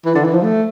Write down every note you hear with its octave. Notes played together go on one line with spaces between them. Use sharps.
E3
D3
E3
F3
A3